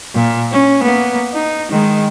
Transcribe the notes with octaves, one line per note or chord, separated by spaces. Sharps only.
A#2
C#4
A#3 B3
D#4
D#3 G#3